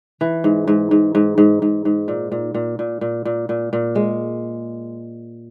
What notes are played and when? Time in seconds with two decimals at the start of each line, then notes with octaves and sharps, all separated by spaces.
0.21 E3
0.44 G#2
0.68 G#2
0.91 G#2
1.15 G#2
1.38 G#2
1.62 G#2
1.85 G#2
2.08 A#2
2.32 A#2
2.54 A#2
2.79 A#2
3.01 A#2
3.25 A#2
3.49 A#2
3.73 A#2
3.95 G#3